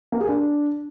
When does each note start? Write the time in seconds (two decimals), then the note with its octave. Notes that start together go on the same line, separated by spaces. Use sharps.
0.12 A#3
0.20 G#4
0.29 D4